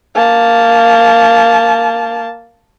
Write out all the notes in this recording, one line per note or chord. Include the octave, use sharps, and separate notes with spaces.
A#3 A5